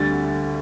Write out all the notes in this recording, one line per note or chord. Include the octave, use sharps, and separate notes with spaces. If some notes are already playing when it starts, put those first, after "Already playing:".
Already playing: D2 D3 G3 A6